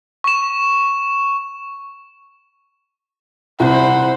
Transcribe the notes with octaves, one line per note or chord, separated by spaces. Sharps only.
C#6 E7
C2 E4 C5 F#5 B5